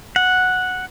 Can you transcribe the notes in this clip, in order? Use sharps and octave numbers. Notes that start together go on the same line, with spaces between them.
F#5